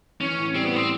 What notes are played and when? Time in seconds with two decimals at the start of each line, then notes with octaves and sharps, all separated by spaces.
0.21 E3 C#4
0.38 A2
0.55 G3 C4
0.65 B3
0.72 A2 C4